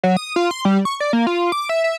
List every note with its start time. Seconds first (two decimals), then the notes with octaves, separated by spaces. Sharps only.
0.03 F#3
0.17 D#6
0.36 F4
0.51 C6
0.65 G3
0.85 C#6
1.00 D5
1.13 A#3
1.27 F4
1.52 D6
1.69 E5
1.84 E5